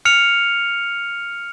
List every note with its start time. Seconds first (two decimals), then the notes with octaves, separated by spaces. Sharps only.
0.05 F6 C#7 F7